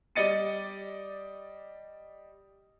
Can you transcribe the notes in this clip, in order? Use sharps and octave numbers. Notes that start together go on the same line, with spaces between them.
G3 D5 D#5 A6 C#7 D#7